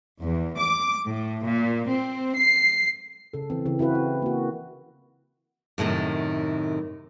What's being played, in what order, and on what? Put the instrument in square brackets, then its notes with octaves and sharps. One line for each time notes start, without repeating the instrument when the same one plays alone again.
[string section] E2
D6
A2
A#2
C4
C7
[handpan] C#3 A4
E3 C4
C#3 E3
C4 E4 F#4 B4 F5
E4
A#3 F#4
[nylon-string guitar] F#2 A2 C3 D#3